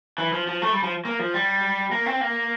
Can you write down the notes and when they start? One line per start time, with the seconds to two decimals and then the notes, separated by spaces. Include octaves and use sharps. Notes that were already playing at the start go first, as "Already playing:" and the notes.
0.18 E3
0.33 F3
0.47 F3
0.62 A3
0.72 G3
0.83 F3
1.05 A#3
1.19 F3
1.34 G3
1.91 A#3
2.06 C4
2.21 A#3